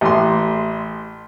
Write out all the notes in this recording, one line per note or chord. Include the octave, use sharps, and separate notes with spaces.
A1 C6